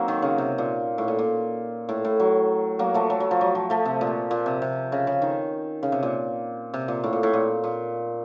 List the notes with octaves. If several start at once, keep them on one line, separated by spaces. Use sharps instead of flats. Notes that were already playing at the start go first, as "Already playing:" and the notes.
Already playing: F#3 A#3 C4 D#4
D#3
C#3
C3
A#2
A2
A#2
A#2
A2
A2
F#3
F#3 A#3
F3 A3
F#3
F#3
F3
F#3
F3
F3 A3
C3
A#2
A#2
C3
C3
C#3
C#3
D#3
C#3
C3
A#2
C3
A#2
A2
A#2
A2
A#2
A#2